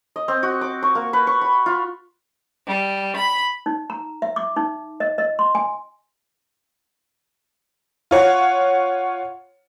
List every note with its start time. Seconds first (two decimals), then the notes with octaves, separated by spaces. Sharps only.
0.16 D#5
0.28 C4
0.43 F#4
0.61 D6
0.83 C#6
0.95 A#3
1.13 B4
1.27 C#6
1.41 B5
1.66 F4
2.66 G3
3.17 B5
3.66 D#4
3.90 A#5
4.22 E5
4.36 D6
4.56 D#4
5.00 D#5
5.18 D#5
5.39 C6
5.55 G#5
8.11 F4 C#5 F#5